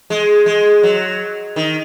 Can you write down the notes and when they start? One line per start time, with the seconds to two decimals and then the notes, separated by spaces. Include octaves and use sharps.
0.10 G#3
0.46 G#3
0.83 F#3
1.56 D#3